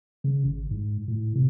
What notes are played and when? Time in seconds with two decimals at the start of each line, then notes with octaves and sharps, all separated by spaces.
0.24 C#3
0.45 G#1
0.71 G#2
1.08 A2
1.35 C3